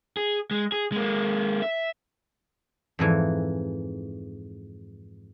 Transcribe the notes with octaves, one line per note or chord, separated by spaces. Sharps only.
G#4
G#3
G#4
G#3 A#3
E5
F2 G#2 E3